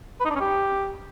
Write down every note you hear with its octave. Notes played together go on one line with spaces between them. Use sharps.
B4
D#4
D4
C#4
G4